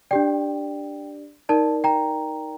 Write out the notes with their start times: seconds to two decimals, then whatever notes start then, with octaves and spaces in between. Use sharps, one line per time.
0.11 D4 G4 D5 G5
1.49 D#4 A#4 D5 A5
1.84 G5 A#5